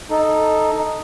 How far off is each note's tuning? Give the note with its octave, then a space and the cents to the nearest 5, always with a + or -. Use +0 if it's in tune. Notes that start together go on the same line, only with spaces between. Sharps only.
D#4 +0 A4 +0